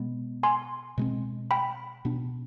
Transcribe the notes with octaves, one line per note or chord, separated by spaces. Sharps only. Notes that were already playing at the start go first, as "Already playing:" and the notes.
Already playing: B2 G#3 B3
G#5 C6
B2 G#3 C4
G5 B5
B2 B3 D4